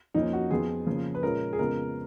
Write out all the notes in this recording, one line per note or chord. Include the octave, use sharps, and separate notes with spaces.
F2 F3 A#3 C#4 D#4
F#4
F2 F3 B3 G#4
C#3 F3 A#3 C#4
B4
A#2 G#3 C#4 A#4
G#4
F2 C#3 G#3 B3 A#4